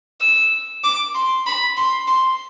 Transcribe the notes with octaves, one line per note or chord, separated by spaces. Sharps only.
E6
D6
C6
B5
C6
C6